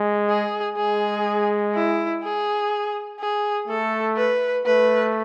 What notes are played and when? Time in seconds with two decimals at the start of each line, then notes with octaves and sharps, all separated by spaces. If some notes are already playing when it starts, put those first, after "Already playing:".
Already playing: G#3
0.29 G#4
0.77 G#3 G#4
1.75 E4
2.23 G#4
3.20 G#4
3.68 A3 A4
4.17 B4
4.65 A3 B4